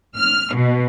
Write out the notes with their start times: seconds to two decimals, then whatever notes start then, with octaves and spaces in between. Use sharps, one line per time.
0.16 F6
0.56 B2